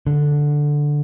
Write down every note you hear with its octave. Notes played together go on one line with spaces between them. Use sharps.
D3